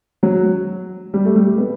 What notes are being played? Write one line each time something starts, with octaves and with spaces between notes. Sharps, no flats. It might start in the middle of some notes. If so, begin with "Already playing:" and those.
F#3
G3
A3
G3
B3